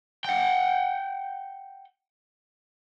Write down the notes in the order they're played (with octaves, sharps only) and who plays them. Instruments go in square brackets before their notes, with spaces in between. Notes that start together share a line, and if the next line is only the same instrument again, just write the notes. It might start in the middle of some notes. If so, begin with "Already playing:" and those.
[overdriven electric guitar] F#5 G5